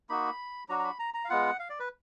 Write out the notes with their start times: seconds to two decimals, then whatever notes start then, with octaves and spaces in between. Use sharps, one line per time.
0.09 A#3 D#4 F#4 B5
0.69 F#3 D4 F#4 A#5
0.79 A#5
0.84 B5
0.99 A#5
1.14 A#5
1.25 F5
1.29 G#3 B3 F4 F#5
1.59 F5
1.70 D5
1.80 B4